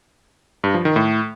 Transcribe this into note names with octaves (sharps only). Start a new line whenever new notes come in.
G2
F3
D#3
A2